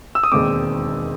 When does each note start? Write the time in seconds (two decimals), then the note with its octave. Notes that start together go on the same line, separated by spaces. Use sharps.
0.15 E6
0.23 D#6
0.32 E1 D#2 D#3 G#3 C4 D6